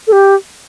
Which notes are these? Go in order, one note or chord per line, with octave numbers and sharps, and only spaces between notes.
A4
G4